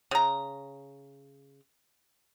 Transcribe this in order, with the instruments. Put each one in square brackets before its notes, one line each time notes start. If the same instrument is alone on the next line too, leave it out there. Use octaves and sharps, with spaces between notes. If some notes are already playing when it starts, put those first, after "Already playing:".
[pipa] C#3 A#5